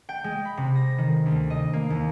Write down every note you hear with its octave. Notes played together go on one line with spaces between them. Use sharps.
G5
G#3
B5
C3
A#6
D#3
D2
D#5
A#3
D#2